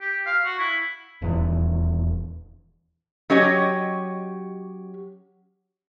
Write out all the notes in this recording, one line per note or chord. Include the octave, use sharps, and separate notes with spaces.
G4
F5
F#4
E4
D#1 E2
F#3 C#4 G4 C#5 D#5